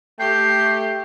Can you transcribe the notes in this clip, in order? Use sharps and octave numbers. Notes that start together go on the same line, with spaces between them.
A3 G4 G5 C7